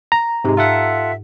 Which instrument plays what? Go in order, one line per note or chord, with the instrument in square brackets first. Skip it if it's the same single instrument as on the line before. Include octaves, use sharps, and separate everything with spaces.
[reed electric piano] A#5
[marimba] G#2 D#4 G4 [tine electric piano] C3 G#3
[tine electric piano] F4 A4 F#5 [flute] E5